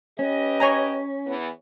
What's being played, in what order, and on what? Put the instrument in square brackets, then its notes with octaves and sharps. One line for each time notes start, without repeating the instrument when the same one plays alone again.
[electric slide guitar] C#4 [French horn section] G4 B4 D#5
[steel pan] C#5 G#5 A#5
[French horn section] E2 E3 B3